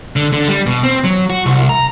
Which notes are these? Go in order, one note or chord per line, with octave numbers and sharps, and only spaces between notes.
D3
D3
G3
B2
C4
F#3
F#4
C2
A#5